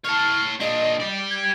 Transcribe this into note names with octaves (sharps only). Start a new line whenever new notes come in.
C#5 A5 F6
A#2 D4 D#5
G4 D5
G#6